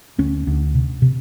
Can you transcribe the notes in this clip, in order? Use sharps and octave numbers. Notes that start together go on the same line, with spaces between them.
D2 C#4
D2
C3
C3